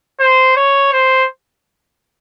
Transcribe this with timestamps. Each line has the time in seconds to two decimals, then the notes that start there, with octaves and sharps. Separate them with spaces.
0.20 C5
0.57 C#5
0.93 C5